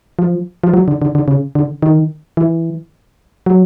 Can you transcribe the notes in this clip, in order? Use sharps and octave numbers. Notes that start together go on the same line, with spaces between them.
F3
F3
F#3
D3
D3
D3
C#3
D3
D#3
E3
F#3